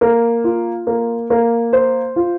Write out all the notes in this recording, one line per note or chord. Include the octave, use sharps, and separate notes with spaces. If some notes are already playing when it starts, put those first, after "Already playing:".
A#3
F4
A#3
A#3
C5
F4